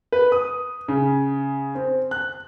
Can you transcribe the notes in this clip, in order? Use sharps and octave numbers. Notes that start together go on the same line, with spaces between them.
B4
D#6
C#3
C4
F#6